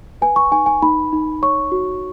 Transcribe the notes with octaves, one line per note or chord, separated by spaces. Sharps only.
B4 G#5
C#6
D#4 G#5
G#5
D#4 B5
D#4
C#5 C#6
F#4